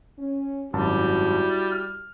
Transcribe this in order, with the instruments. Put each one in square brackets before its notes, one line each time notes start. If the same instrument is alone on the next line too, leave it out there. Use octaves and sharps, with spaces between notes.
[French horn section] C#4
[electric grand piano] G#1 F#2 A5 [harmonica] G3 [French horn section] E4 F#4
[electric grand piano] F6